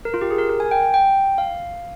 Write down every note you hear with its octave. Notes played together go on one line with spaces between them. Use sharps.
A#4
F4
G4
G#4
A#4
A#4
G#5
G5
G5
G5
F5